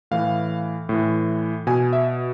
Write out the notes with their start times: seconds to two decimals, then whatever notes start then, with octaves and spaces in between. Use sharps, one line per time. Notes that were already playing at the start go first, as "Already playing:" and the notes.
0.11 A2 E3 F5
0.89 A2 E3
1.67 B2 G#5
1.93 E5